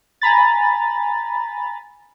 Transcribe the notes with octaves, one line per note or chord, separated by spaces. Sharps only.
G#5 A#5 B5 A6